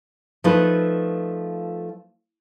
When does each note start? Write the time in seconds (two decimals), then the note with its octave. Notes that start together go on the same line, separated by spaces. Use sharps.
0.44 F3 A3 D#4 F4 B4